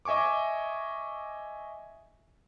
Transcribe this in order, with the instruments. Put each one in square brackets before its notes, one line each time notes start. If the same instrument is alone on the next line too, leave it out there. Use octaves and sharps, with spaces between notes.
[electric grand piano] D#5 E5 G#5 C#6 D6